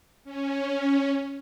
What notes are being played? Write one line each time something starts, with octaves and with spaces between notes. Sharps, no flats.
C#4